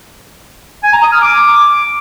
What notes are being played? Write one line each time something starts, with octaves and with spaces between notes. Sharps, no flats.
G#5
A#5
D#6
F6
D6